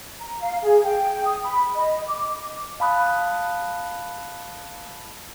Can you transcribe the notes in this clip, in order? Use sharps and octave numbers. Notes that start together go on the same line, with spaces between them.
A#5
F5
G#4
G5
D#6
B5
D#5
D6
F5 A5 B5 D#6 F#6